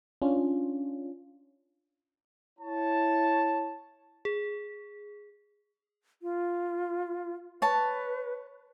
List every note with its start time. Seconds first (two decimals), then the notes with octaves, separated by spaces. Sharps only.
0.22 C#4 D4 F4
2.59 E4 C#5 A5
4.25 G#4
6.22 F4
7.62 B4 C#5 A5